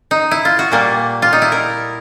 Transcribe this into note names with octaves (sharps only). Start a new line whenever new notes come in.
D#4
E4
F4
F#4
A#2 G3 A#3
F4
D#4
E4
A#4